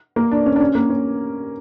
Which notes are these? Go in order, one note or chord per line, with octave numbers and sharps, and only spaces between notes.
A#3
D4
C#4
D4
C#4
A#3
C#4